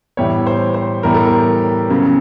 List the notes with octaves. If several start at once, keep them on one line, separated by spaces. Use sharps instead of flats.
A2 E3 G3 B3 C#5
C5
C5
A2 E3 G3 B3 A#4
A4
A#4
C#3 F#3 B3